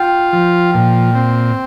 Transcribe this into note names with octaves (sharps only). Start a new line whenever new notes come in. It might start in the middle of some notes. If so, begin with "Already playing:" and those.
Already playing: F4 G5
F3
A#2
C4